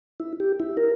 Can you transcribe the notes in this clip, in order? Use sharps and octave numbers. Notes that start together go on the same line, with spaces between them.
E4
G4
E4
A#4